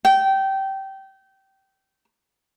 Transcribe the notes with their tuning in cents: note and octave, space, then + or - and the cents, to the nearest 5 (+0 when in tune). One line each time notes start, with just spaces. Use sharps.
G5 -20